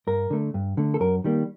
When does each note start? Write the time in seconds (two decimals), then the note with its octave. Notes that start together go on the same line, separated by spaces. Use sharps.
0.07 G2 A#4
0.30 D3 A3
0.54 G2
0.77 D3 A3
0.94 A4
1.00 F#2 A#4
1.24 D#3 G3 A#3